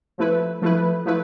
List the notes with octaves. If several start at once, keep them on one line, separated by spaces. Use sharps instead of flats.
F3 A3 E4 B4
F3 A3 E4 B4
F3 A3 E4 B4